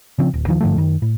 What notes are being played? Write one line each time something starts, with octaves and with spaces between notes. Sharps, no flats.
C#3 F3 C4
D1
D#2 D#3 F3
G2 D3 F3 A3
F#2 D#3
A2